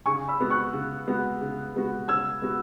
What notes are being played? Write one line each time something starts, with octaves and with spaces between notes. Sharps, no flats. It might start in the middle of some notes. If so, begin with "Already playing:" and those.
C#3 G#5 C#6
B5 E6
G#3 B3 F#4
C#6 F#6
C#3
G#3 B3 F#4
C#3
G#3 B3 F#4
C#3 E6 G#6
G#3 B3 F#4